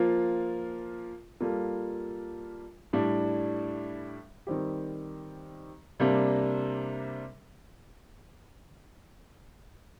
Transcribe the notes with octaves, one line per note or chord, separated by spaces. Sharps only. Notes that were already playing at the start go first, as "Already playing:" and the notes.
Already playing: F3 A#3 F4
G3 A#3 F4 A4
A2 G3 D4
D#3 G3 C4 G4
C3 G3 A#3 D4